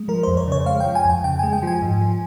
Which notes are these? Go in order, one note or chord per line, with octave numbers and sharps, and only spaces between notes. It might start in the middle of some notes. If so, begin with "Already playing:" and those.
Already playing: G#3
F3 A#4
F2 C5
C#5
C#3 C#5
G#3 F5
G5
F3
G#5
F2 G5
C#3 G5
G#3 G#5
G5
F3 G#5
G#2
F3